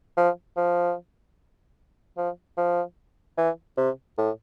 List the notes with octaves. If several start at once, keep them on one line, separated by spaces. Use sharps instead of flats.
F3
F3
F3
F3
E3
C3
A2